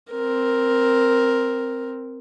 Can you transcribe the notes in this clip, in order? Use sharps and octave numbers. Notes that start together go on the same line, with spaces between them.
C4 A#4